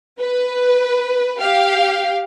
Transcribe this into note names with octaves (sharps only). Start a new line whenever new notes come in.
B4
G4 F5